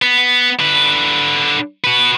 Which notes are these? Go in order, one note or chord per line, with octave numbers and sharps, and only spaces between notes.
B3
D3 B4
F#4 B4